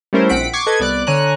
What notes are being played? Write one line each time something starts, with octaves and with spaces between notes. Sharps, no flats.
G3 A3 C#4 E4 A#4 C5
A#1 C4 F#5 B6 D7
C#6 D6 G#6 C7 C#7
A4 B4 D#5 G#6
C2 B3 D5 D6 F#6
D3 C#5 G#5 A#5 F#6